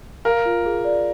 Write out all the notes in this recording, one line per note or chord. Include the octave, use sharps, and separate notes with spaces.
A#4 F5
F4
G#4
D5